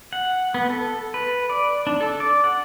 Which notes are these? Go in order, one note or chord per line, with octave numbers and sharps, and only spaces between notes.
F#5
B3
A4
B4
D5
D4
A4
D5
F#5